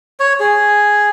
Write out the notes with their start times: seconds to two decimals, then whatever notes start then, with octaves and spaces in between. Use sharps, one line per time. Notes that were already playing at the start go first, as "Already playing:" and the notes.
0.20 C#5
0.40 G#4